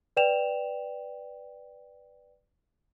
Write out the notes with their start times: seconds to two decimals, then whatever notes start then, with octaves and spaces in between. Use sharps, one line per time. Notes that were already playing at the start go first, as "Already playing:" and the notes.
0.17 B4 D5 G5 E7 F7